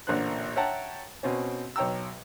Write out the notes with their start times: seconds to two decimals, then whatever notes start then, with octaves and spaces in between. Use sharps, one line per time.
0.07 A1 A#2 D3 C5 F#6
0.56 C#5 E5 F#5 G5 A5 A#5
1.23 B2 C4 C#4
1.76 B1 C#5 G5 A#5 E6